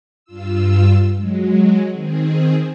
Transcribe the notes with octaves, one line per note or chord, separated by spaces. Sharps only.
G2 F4 E6
F#3 G#3
D#3 C4 G#4